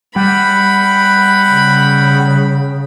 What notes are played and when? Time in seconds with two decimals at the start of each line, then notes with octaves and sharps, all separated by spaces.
0.16 G3 F#5 G5 B5
1.51 C#3